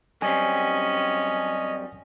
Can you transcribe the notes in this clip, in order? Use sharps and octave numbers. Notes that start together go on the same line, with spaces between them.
F#2 G3 C4 C#4 D#5 G#5